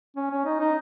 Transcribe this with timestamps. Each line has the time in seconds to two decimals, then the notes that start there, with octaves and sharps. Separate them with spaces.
0.16 C#4
0.31 C#4
0.45 D#4
0.60 D#4